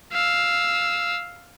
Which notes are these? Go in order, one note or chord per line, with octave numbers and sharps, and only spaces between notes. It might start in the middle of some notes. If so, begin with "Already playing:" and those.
F5 E6